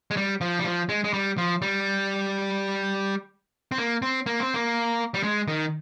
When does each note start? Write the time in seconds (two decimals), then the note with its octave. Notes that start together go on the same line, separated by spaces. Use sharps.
0.11 G#3
0.17 G3
0.41 F3
0.59 G3
0.64 F3
0.89 G#3
1.04 G#3
1.14 G3
1.38 F3
1.62 G3
3.72 C4
3.78 A#3
4.02 C4
4.26 A#3
4.40 C4
4.54 A#3
5.14 G3
5.23 G#3
5.48 D#3